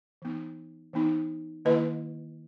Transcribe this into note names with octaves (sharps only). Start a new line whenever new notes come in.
E3 B3 D#4
E3 B3 D#4
D#3 A#3 E4 B4 D#5